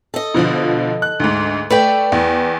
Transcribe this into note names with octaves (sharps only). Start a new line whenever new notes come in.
A4 D#5
B2 D3 F3
F#6
D2 G#2
A3 B4 D5 G5
E2